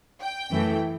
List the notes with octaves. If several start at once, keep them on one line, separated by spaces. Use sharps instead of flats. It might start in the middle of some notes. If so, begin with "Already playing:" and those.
G5
F#2 E3 A3